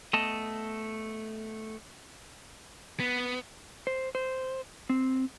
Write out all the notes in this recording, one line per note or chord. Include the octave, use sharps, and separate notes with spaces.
A3 B3 D#5 A5
B3
C5
C5
C4